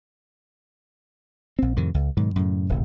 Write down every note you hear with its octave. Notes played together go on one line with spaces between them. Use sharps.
A#1 C4
F2 A2 C3 D#3
C#2
G#2 B2 D#3 F#3
F#2 A2 C#3
D1 G#1 A2 C3